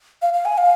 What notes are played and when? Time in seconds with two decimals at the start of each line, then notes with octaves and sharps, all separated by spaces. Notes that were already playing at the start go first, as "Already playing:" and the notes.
0.22 F5
0.33 F5
0.45 G#5
0.58 F5